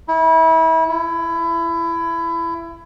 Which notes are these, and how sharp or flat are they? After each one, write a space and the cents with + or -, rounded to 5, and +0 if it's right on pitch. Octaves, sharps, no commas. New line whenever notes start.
E4 -30
E4 +20